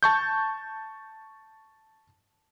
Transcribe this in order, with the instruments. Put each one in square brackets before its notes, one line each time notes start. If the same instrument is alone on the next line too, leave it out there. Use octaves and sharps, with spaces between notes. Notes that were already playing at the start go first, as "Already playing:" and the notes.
[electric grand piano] A5 C#6 G6